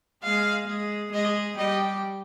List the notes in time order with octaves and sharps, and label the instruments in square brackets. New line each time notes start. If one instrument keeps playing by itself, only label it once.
[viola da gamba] G#3 G#4 [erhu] F5
[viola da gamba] G#3 G#4
[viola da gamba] G#3 G#4 [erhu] D#5
[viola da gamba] G3 G4 [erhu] D#5